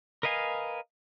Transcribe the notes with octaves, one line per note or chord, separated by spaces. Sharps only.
A#4 B4 D#5 F5 G#5